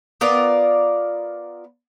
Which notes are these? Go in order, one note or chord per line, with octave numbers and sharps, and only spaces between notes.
B3 F4 A#4 D5